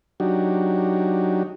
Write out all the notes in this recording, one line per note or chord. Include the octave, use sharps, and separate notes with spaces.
F#3 D4 D#4 F#4 G4